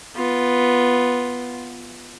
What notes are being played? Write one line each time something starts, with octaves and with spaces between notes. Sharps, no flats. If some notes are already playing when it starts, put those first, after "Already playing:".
B3 F4